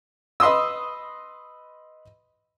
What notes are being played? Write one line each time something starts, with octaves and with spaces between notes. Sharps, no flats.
B4 D#5 C6 D#6 E6